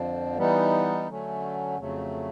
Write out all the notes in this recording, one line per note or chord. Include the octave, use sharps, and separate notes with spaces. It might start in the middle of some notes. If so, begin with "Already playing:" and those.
Already playing: F2 D3 F3
E3 G3 B3 D#4
D3 F#3 A3 C#4
F2 C#3 F#3 A3